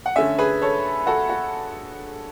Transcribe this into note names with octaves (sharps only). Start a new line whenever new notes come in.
F#5
D3 A3 C#4 E5 G#5
G#4 B4
A4 C#5
F#4 A4
F#4